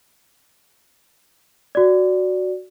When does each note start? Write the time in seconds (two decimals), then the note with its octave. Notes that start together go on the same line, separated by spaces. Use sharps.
1.75 F#4 D5